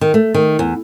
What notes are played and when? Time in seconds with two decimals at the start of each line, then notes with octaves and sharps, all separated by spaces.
0.01 D#3
0.14 A3
0.34 D#3
0.59 E2